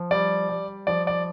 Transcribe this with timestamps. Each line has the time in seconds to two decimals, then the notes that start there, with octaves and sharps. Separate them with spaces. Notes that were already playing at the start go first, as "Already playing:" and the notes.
Already playing: F3
0.11 G3 D5
0.49 G3
0.87 F3 D5
1.07 D5